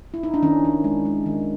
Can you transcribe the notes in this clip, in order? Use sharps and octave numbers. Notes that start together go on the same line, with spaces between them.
E4
D#4
D4
D#3 C#4
D#3
G#3
G#3
D#3